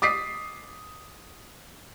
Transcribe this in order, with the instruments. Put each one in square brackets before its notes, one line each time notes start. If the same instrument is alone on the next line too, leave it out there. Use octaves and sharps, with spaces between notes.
[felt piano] D6 D#6 B6 C7